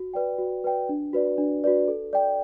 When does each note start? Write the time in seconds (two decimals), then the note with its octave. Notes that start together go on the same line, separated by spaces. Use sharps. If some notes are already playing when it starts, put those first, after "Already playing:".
Already playing: F#4
0.14 B4 D5 G5
0.38 F#4
0.64 B4 D5 G5
0.89 D4
1.13 F#4 B4 D5
1.38 D4
1.64 F#4 B4 D5
1.88 A4
2.13 D5 G5